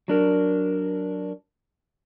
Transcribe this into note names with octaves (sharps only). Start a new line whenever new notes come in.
F#3 D4 A#4